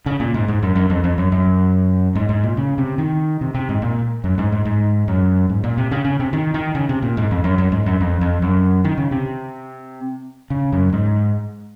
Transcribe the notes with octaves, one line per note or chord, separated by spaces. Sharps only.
C#3
A#2
G#2
G#2
F#2
F#2
F2
F2
F#2
F#2
G#2
G#2
A#2
C#3
C3
D#3
C3
C3
G#2
A#2
F#2
G#2
G#2
G#2
F#2
G#2
A#2
C3
C#3
C#3
C3
D#3
D#3
C#3
C3
A#2
G#2
F2
F#2
F#2
G#2
F#2
F2
F2
F#2
D#3
C#3
C3
C#3
F#2
G#2